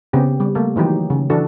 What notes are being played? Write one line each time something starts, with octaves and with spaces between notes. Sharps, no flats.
C#3 B3 C4 G4
G3
A3 A#3
D#3 E3 F#3 D#4 G4
C#3
E3 D4 F#4 A4